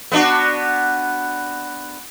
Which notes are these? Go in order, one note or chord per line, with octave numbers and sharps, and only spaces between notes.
B3 D4 F#4